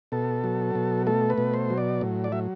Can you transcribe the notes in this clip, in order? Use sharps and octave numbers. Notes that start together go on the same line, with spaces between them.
B2 A4
F#3
B2
A3 A4
B4
B2
C5
F#3
D5
A2
D5
F#3 E5